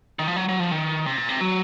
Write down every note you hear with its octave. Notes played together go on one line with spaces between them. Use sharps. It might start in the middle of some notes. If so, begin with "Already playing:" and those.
D#3
F3
F#3
F#3
F3
D#3
C3
A#2
C3
F#3